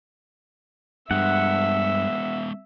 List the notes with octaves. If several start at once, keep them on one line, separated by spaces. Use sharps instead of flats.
G2 G#3 B3 E5 F#5